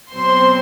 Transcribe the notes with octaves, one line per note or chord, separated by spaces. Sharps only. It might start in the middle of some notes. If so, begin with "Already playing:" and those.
B2 F#3 C4 C5 C6